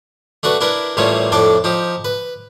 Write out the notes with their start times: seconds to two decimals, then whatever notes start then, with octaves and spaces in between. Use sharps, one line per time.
0.43 A3 D4 F#4 B4
0.61 D4 E4 A#4 B4
0.97 A1 A#2 G3 A3 F4 C#5
1.32 F2 A2 D4 A4 D6
1.64 F3 D#4 G4
2.05 B4